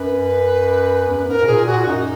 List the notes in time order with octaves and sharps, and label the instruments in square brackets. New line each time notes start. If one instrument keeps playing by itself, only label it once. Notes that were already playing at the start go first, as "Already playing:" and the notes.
Already playing: [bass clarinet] F#2 [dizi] B4
[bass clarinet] E2
F#2
[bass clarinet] G#2 [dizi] A#4
[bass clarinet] B2
[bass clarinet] A#2 [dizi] G#4
[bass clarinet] A#2 [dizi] F#4
[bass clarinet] F#2 [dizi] D#4